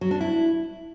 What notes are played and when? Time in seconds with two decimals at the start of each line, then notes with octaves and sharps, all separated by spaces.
0.01 F#3
0.11 D4
0.21 E4